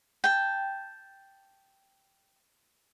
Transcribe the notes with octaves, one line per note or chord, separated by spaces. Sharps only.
G5 A5